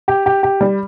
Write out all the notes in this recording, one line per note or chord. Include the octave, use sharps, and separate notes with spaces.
G4
G4
G4
G3